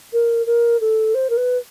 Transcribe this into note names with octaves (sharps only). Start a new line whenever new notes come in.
A#4
A#4
A4
C5
A#4
B4